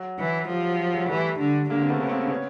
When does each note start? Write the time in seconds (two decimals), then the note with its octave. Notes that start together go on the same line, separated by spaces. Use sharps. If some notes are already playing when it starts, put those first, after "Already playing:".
Already playing: F#3
0.19 E3
0.49 F3 G3
0.64 F#3
0.94 F#3 G#3
1.09 E3 G3 A3
1.40 D3
1.70 D3 G#3 A#3
1.82 C4
1.90 A3 B3
2.00 C#3 B3
2.09 A#3 C4
2.30 B3 C#4